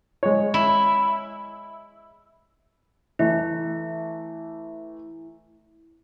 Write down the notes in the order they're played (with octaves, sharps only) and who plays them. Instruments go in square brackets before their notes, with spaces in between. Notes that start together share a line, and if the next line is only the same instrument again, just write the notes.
[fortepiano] G#3 C#5
[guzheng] E4
[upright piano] E3 A3 [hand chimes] E4